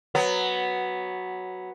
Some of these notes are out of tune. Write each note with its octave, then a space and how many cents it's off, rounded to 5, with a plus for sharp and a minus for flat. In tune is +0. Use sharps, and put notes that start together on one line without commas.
F#3 +0 B3 +0